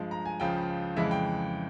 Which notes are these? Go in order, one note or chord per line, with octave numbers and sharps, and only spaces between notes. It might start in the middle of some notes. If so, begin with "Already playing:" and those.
Already playing: G2 F3 G#3
A#5
G#5
C#2 C#3 F3 G5
F2 C#3 E3 G#3 E5
G5